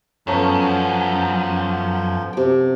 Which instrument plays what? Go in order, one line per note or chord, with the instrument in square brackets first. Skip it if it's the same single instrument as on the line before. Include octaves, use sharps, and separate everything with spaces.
[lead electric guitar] F#2 [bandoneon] F3 [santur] A3 B3 C#4
[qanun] C3 G5